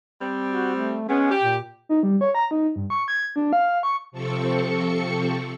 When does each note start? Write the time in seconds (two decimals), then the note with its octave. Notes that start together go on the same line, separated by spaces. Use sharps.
0.21 G3 C4
0.50 F#4
0.75 A3
1.08 G#3 B3 C#4
1.31 G4
1.42 A#2
1.89 D#4
2.03 G3
2.21 C#5
2.35 A#5
2.51 D#4
2.76 G2
2.90 C#6
3.08 G#6
3.36 D4
3.53 F5
3.83 C#6
4.11 C3 F3 C4 A4 C#6 C#7